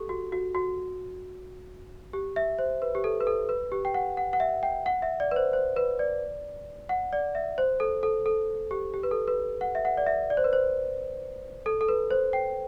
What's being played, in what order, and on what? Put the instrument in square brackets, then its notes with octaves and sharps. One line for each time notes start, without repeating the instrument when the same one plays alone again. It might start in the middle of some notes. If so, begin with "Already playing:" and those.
Already playing: [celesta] G4 A4
F#4
F#4
F#4
G4
E5
C5
B4
G4
A4
B4
A4
B4
G4
G5
F#5
F#5
F#5
E5
G5
F#5
E5
D5
B4
C5
C5
B4
D5
F#5
D5
E5
C5
A4
A4
A4
G4
G4
B4
A4
B4
F#5
E5
F#5
D5
E5
D5
C5
B4
C5
A4
A4
B4
C5
G5